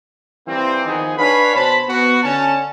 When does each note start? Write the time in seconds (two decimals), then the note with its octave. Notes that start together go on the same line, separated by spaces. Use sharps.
0.48 E3 G3 A#3 C4
0.86 D#3 F3 B3 D#4 G#4
1.18 D4 B4 C#5 F5 G#5 B5
1.55 B2 C5 A5 B5
1.88 B3 F#4
2.23 D3 C#4 A5